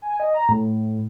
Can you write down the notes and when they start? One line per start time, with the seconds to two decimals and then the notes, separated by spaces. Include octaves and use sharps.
0.02 G#5
0.20 D#5
0.34 A#5
0.49 A2